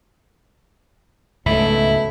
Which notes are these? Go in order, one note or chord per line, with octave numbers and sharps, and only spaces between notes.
C#2 G#2 B2 F#3 A3 E4